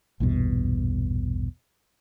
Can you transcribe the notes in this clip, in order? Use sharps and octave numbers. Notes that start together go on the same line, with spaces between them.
A#1 E2 G2 B2